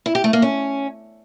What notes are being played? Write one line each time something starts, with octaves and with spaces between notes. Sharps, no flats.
E4
G4
A3
A#3
C#4